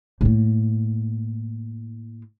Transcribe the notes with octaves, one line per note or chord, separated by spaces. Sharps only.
A2 A#3